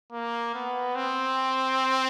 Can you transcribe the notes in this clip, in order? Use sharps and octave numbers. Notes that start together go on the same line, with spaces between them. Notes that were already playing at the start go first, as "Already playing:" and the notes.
A#3
B3
C4